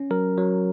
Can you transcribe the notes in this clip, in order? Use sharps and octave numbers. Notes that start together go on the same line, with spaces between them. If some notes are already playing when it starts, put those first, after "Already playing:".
Already playing: C#4
F#3 A#4
F#3